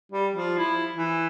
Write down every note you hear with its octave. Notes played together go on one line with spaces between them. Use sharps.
G3
F3
E4
E3